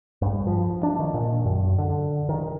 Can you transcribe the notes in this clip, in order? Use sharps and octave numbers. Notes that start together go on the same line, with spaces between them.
G2
F3
D4
D#3
A#2
F#2
D3
D#3